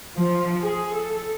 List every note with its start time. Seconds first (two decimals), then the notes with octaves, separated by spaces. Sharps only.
0.15 F3
0.61 G#4
0.93 A4